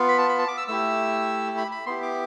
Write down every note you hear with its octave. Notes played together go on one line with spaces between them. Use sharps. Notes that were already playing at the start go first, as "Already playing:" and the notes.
Already playing: B3 F4
B5
A5
B5
A5
D6
E6
A3 E4 G4 E6
B5
B5
B3 E4 G4 C6
D6